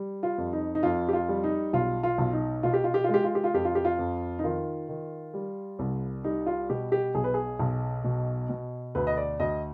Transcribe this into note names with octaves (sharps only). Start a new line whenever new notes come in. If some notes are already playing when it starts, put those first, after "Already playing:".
Already playing: G3
F4
F2
D#4
D#4
F2 F4
G4
F4
G3
D#4
B1 F4
F4
B1
D#4
B2 F4
G4
F4
G4
G#3 F4
G4
F4
G4
F4
F2 G4
F4
G4
F4
F2
D#4
D#3 F4
D#3
G3
C2
G3 D#4
F4
B2 G4
G4
B1 G#4
B4
G#4
B1
B2
B2
D2 B4
D#5
D5
D2 D#5